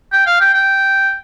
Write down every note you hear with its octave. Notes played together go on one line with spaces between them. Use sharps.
G5
F5
G5
G5